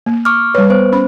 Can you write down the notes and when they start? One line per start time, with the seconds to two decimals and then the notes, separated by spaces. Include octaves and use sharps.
0.06 A#3
0.25 C#6 D6 F6
0.55 G3 B4 C#5
0.70 B3 C5
0.92 C#4 B5